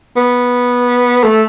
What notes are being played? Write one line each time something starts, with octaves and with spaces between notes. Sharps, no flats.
B3
A3